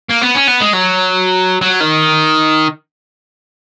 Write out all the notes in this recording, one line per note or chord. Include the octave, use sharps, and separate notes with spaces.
A#3
B3
C#4
B3
G#3
F#3
F#3
D#3